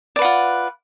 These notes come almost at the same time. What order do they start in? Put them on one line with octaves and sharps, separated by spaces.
D5 B4 F#5 F4